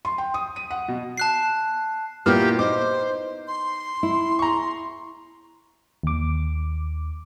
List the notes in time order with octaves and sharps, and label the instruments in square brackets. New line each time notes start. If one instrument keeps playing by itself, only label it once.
[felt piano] C6
G5
D#6
D#7
F#5
B2
[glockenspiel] A5 F#6 C7
[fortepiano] A#2 A#3 F6 [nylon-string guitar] B3 E4 F#4 [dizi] G4
[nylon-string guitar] D#4 [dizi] C5 [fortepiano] D6
[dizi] C6
[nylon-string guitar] E4
[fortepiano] A#5 C#6
[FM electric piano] D#2 D6